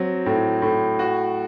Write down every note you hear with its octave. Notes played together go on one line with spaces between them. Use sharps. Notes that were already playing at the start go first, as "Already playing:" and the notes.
Already playing: F#3 C4
A2
A2
F#4